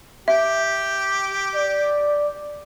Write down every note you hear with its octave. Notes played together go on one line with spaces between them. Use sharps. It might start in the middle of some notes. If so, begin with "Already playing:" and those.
G4 E5
D5